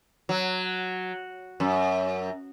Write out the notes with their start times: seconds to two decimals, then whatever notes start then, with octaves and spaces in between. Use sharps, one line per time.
0.29 F#3
1.60 F#2